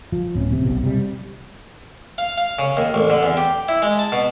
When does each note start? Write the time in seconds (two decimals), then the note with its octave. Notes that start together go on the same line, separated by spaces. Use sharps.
0.12 F3
0.35 D1 C#4
0.52 C3
0.66 B1
0.83 C3 G3
2.18 F5
2.37 F5
2.59 C#3
2.77 D#2
2.94 A1
3.10 D3
3.23 E2
3.37 G4
3.69 E4
3.82 G#3
3.99 A5
4.12 B2